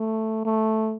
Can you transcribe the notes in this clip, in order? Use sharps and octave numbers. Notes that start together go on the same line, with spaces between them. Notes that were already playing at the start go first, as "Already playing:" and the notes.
Already playing: A3
A3